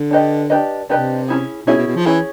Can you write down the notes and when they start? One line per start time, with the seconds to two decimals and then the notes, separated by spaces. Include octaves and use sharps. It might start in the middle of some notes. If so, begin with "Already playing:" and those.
Already playing: D3
0.11 D4 G4 B4 D#5
0.50 D4 G4 B4 D#5
0.89 C3 D4 G4 B4 D#5
1.28 C#4 E4 G#4
1.67 B2 C#4 E4 G#4
1.77 B2
1.87 B2
1.96 F3
2.06 E3 C#4 E4 G#4